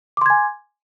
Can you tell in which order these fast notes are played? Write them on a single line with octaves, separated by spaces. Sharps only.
D6 C6 G#6 G#5